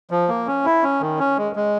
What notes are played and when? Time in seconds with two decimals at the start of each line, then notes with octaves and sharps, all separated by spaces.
0.11 F3
0.28 A#3
0.47 C#4
0.65 E4
0.83 C#4
1.01 D#3
1.19 C#4
1.37 G#3
1.56 G#3